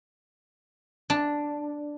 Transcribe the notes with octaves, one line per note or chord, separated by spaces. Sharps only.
D4